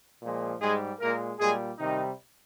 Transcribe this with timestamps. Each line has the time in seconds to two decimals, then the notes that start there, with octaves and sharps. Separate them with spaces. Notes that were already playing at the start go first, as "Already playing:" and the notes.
0.22 A#2 F3 G#3
0.60 G#2 G3 G#3 G#4
1.00 A#2 G#3 A#3 A#4
1.39 A#2 G3 G#3 G#4
1.79 C3 D#3 G3 D#4